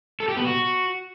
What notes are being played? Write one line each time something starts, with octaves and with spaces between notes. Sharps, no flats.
A4
G4
B3
F#4